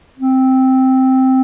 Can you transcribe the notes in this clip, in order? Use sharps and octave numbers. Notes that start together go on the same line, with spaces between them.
C4